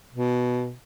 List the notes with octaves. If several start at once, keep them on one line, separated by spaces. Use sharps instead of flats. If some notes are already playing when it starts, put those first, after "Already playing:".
B2